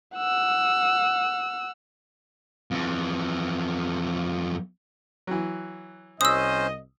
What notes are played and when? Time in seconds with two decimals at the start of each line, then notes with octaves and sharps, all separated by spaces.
0.16 F#5 E6
2.71 F2 E3
5.27 E3 F#3
6.21 C2 C#4 C5 D#5 D#6 E6